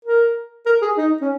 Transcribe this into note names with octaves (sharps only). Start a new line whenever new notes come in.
A#4
A#4
G#4
D#4
C#4